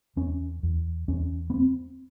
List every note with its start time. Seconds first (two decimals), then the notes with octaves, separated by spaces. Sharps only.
0.16 E2 C#4
0.63 E2
1.08 E2 C#4
1.50 B3
1.54 C4